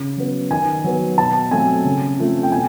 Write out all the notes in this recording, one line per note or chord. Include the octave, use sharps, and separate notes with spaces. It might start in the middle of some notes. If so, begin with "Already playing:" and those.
Already playing: C#3
F#3 B3
D#3 G#5
F#3 B3
B2 A5
F#3 A3 C4 G#5
C#3
F3 A3 C4
G5
B2 G#5